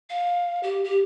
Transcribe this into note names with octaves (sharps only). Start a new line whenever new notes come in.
F5
G4
G4